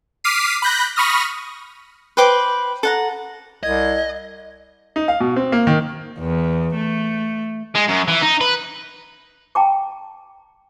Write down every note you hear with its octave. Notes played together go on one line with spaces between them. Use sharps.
D6 F6 B6 C7 D#7
B5 F#6 G6 A#6
B5 C#6 D#6 F6 A#6
B4 C5 G5 D6
A4 F#5 A#5
C2 D#5 G#6
D#4
F5
B2
C4
A#3
D#3
E2
A3
G#3
F#2
E3
D#4
B4
G5 A5 A#5 D6